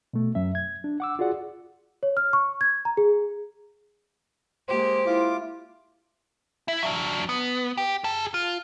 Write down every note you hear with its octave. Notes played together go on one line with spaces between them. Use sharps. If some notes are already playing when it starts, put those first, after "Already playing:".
B2 A3
F#2 F#3 C#4 E5
G#6
D4
F#5 D6 E6
F4 F#4 G#4 D5 F#5
C#5
F6
C#6
G#6
A#5
G#4
G#3 A#3 G4 C5
E4 F4 D6
E4
F#3 D4
B3
G4
G#4 A5
F4